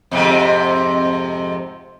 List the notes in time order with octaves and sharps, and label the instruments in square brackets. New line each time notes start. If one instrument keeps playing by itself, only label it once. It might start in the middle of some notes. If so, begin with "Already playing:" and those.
[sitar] F2 G#2 C3